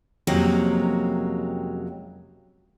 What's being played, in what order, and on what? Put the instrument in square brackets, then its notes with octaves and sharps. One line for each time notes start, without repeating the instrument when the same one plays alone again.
[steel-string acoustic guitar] F2 C3 F#3 G#3 A#3 C#4